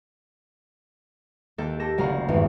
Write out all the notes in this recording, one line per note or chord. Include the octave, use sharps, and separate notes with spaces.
D#2 A#3 A4 G6
G4 A4 A5 A#6 E7
F#1 D2 F5 A#5 G6
G#1 E2 G2